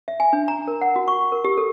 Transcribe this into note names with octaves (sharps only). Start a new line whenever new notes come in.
E5
G#5
D4
A#5
A#4
F#5
F#4
C#6
A#4
G4
A4